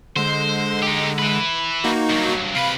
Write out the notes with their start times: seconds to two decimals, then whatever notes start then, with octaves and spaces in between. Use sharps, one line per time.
0.16 D3 G#3 C5
0.83 D#4 G4
1.19 E4 B4
1.84 A#3 D#4 F#4
2.10 G2 F#3
2.55 C3 B4 F5 B5